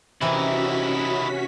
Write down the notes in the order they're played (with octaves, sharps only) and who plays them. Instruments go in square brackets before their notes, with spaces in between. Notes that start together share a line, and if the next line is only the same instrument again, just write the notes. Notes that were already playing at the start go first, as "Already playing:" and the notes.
[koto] C3 E3 A#3 [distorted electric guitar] D#3 E4 [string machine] C#4 F#4 B6